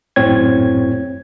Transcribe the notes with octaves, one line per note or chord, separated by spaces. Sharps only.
G1 F#2 A2 C4 C#5 G#6